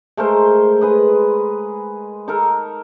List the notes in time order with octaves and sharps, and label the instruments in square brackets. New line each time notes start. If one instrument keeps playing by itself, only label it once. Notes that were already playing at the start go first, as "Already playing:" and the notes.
[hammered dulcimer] G#3 A3 A#4 C5
G#4 B4 D#5
D#4 A4 A#4